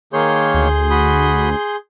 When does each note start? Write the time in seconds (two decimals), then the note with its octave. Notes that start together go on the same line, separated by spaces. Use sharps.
0.13 D#3 A#3 G#4 C#5 C6 G6
0.54 D2
0.90 F#4 B5 D#6